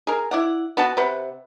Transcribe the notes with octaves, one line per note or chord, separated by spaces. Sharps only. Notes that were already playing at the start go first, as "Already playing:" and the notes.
G#4 A#4
E4 D5 F#5
B3 F#4 F#5 A5
C3 B4 F#5